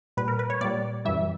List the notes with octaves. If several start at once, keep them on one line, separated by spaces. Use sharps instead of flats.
A#2 G3 B4
A#4
B4
C#5
A#2 G3 D5
F#2 E3 G3 E5